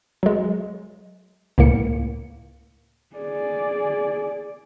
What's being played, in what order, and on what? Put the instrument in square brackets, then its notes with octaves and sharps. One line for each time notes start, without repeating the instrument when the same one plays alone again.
[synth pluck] F#3 G#3
C#2 A2 A#3 C#7
[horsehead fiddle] G#4 D5